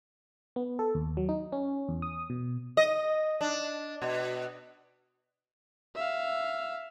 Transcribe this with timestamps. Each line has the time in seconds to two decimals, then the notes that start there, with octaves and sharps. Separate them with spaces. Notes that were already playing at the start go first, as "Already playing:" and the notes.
0.56 B3
0.79 A4
0.95 D#2
1.17 F#3
1.29 D#4
1.52 C#4
1.89 E2
2.02 D#6
2.30 B2
2.77 D#5
3.41 D4
4.02 B2
5.95 E5 F5